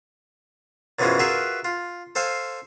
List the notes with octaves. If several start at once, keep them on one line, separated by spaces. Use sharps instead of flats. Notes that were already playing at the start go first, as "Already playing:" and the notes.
F#2 B2 E3 F3 G#3 C#4
F4 F#4 G#4 A#4 B4 E5
F4
A4 C5 F5 G#5